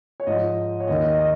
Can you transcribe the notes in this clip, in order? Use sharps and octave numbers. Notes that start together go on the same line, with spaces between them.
C#5
G#2 F3 D#5
C#5
D#2 D#3 D#5
D#5
D#5
D#5